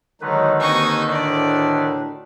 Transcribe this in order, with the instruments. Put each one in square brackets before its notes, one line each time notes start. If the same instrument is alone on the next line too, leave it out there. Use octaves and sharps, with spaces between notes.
[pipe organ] D3 D#3 B4 [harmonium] F#3 G#3 D#4
[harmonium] D#2 C4 G#5 [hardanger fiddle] D#4 C#6
[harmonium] D2 A2 D4 [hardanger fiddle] D5